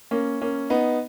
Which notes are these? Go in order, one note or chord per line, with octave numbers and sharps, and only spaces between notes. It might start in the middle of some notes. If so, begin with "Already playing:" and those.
A#3 C#4
A#3 C#4
B3 D#4